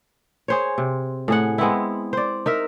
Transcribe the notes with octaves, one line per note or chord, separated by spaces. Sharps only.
G#4 C5 C#5
C3
A2 G#4 F#5
G#3 B3 C4 E4
C5 D5
D#4 A#4 E5